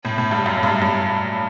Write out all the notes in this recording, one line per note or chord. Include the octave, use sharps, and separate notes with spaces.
A2
A2
G2
F#2
G2
G2